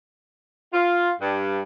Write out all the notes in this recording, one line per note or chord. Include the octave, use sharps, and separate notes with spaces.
F4
G2